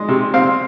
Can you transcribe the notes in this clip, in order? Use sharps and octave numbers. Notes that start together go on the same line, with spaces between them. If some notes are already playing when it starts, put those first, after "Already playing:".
Already playing: G#3
C3
C4 F5